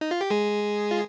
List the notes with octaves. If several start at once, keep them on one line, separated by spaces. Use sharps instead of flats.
D#4
F4
G4
G#3 G#4
F4